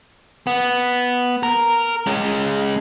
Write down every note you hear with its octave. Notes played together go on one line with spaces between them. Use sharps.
B3
A#4
G#3 C#4